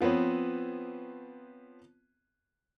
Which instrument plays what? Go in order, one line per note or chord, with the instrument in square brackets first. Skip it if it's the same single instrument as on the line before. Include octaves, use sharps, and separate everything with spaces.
[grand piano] F3 B3 C4 B4 C#5